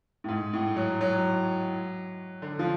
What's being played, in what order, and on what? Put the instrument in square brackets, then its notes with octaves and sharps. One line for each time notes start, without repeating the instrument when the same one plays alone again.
[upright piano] A2
G#2
A2
F#3
F#3
D3
F3